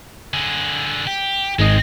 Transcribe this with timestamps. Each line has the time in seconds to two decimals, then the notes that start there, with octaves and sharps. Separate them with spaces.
0.34 D3 G#4
1.07 G4
1.59 G#1 G#2 G#3 C4 D#5